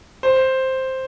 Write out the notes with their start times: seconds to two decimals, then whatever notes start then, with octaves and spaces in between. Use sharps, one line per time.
0.23 C5